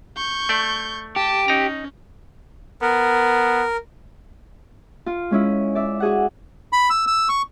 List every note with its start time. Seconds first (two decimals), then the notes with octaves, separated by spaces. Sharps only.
0.17 C#6 G6
0.49 A3 D5
1.16 G4 A5
1.48 C#4 D#4 A#5
2.82 B3 A#4
5.06 F4
5.31 G#3 C#4 E4
5.75 D5 E5
6.00 F#4 G#4 F#5
6.73 B5
6.90 E6
7.07 E6
7.29 C#6